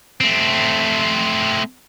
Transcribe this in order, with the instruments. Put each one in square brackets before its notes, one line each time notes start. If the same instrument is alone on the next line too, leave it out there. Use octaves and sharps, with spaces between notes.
[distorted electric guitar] A3 C4